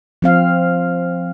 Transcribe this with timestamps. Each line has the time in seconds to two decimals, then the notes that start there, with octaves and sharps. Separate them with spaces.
0.22 F3 C4 F5